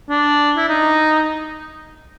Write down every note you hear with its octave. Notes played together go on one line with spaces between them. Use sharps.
D4
E4
D#4